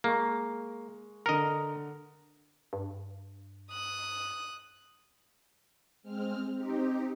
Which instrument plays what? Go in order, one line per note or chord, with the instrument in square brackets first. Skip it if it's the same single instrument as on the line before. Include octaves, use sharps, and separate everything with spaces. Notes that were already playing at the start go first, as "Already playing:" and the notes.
[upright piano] G#3 C#6 [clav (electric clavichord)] A#3
[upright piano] D3 C#7 [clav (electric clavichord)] A#4 D#5
[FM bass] G2
[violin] D#6 F#6
[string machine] G#3 C4 F6
C4 D#4 G4